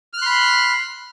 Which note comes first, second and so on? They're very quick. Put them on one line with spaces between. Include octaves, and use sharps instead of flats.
F6 F#6 C6 B5